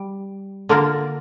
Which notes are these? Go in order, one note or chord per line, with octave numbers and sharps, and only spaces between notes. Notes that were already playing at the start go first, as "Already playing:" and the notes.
Already playing: G3
D3 A#3 D4 F4 A#4